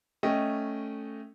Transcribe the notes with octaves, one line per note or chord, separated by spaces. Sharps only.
A3 C#4 D#5 G5